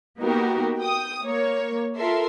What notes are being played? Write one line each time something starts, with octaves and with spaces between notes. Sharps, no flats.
A#3 B3 D#4 F#4 G4 A#4
G5 D#6
A#3 C#5
F4 A4 A#4 E5 C6